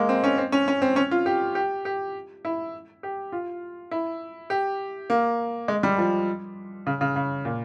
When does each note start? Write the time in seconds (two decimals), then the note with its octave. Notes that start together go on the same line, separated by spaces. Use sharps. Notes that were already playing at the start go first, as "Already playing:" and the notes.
Already playing: G#3 A#3
0.09 C4
0.24 C#4
0.38 C4
0.52 C#4
0.68 C#4
0.82 C4
0.96 C#4
1.11 F4
1.26 G4
1.55 G4
1.85 G4
2.45 E4
3.03 G4
3.32 F4
3.91 E4
4.50 G4
5.10 A#3
5.68 G#3
5.83 G3
5.98 F3
6.86 C#3
7.01 C#3
7.16 C#3
7.45 A#2